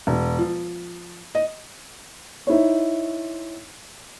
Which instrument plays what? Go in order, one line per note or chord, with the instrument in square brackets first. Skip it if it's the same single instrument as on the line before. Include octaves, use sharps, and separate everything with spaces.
[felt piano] E1
F3
D#5
D#4 E4 C5 C#5